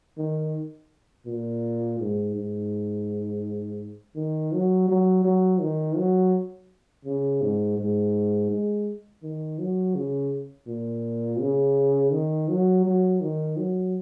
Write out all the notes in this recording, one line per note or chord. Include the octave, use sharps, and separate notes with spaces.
D#3
A#2
G#2
G#2
D#3
F#3
F#3
F#3
D#3
F#3
C#3
G#2
G#2
G#3
D#3
F#3
C#3
A#2
C#3
D#3
F#3
F#3
D#3
F#3